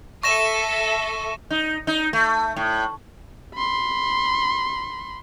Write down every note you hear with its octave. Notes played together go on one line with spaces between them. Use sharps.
A4 E5 C#6 A#6 E7
D#4
D#4
A3
A2
B5 C6